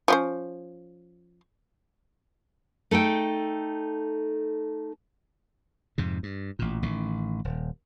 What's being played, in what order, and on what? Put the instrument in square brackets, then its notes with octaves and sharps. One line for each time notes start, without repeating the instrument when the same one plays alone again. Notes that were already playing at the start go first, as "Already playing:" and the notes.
[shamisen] F3 C#4 C5
[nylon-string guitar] A3 D#4 A4 G5
[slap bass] F2 G#2 C3
G2
A1 A#2
A1 D#3
D#1